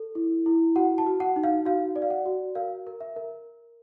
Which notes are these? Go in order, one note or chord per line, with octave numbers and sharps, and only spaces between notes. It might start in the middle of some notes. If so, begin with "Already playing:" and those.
Already playing: A4
E4
E4
F#4 F#5
A5
F#4
F#5
D#4
F5
F#4 F5
D5
F5
F#5
F#4
A#4 F5
A#4
E5
A#4